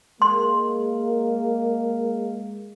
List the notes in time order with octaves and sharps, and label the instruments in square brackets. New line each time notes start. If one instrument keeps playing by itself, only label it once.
[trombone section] G#3 A#3 [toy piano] C6